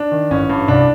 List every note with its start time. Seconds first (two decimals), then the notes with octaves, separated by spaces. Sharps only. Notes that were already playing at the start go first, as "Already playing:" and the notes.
Already playing: D4
0.12 D#3
0.30 A1 C#4
0.50 G2
0.68 C2 D4